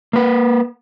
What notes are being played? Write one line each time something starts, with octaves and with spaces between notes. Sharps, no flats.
A#3 B4